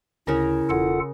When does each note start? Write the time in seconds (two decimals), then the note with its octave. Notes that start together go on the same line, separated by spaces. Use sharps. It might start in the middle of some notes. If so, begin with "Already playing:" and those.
0.27 D2 C#3 E4 A#4 A#5
0.70 E1 F4 A4 F#5